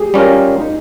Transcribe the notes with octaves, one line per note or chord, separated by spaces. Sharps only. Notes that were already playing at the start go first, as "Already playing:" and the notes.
Already playing: G4 G#4
G3 C#4 F4 A#4
D#4